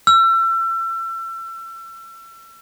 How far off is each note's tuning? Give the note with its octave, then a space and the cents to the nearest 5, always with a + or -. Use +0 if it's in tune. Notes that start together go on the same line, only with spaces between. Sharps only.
E6 +35